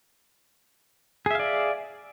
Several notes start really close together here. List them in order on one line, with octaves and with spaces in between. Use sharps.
G#4 E5 F5 D5